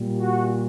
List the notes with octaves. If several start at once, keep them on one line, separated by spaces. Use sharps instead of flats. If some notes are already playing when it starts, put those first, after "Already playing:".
Already playing: A#2 G3
F#4